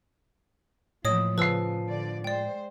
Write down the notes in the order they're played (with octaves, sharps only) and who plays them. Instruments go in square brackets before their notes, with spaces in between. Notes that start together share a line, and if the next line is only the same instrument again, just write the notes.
[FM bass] A2 [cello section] E3 F3 A#3 [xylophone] C#5 D#5 D#6
[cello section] C#3 [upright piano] F3 C7 [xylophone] B4 E6
[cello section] D3 D5
[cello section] G#3 C5 [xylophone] D5 G5